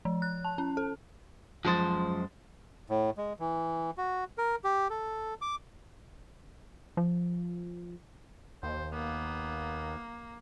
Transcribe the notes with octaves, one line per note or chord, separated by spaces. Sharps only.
F3
F#6
A5
C#4
A4
F#2 F3 G#3 C5 D#6 A6
A2
G#3
E3
F#4
A#4
G4
A4
D6
F3
D#2 C5
A#3 B3